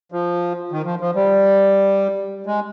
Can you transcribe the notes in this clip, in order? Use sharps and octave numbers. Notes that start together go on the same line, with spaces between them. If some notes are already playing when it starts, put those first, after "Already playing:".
F3
D#3
F3
F3
G3
G#3